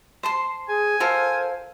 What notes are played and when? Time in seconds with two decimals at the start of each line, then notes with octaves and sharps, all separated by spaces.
0.23 C5 A5 C6
0.69 G#4 G#5
1.00 F4 A4 A#4 C5